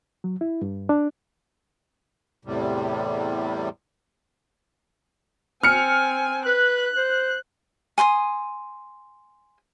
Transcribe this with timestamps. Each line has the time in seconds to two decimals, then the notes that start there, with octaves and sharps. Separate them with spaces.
0.24 F#3
0.41 E4
0.62 G2
0.89 D4
2.45 E2 A2 C3 G3
5.63 C4 G#5 F6 C#7
6.46 B4 F#6
6.97 C5
7.98 G#5 C6 D6 D#6